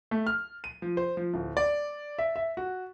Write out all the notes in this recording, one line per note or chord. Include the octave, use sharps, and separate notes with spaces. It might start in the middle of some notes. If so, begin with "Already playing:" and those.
A3
F6
D#7
F3
C5
F3
D1
D5
E5
E5
F#4